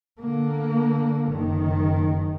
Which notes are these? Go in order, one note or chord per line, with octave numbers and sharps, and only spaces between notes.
D3 A#3
F#1 D#3